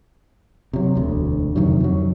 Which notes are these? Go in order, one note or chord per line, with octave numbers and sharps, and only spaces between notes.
C3 F#3
E1 D2
F2 C3 D#3 F#3
F2 F#3